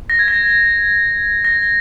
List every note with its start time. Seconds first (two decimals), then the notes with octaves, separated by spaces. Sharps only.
0.10 A#6
0.19 G#6
0.28 A#6
1.45 A#6